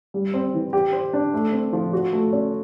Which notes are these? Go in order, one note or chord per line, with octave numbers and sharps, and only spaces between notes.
G3
C4
E3
G4
C5
D4
A3
C4
F3
F#4
A3
C#4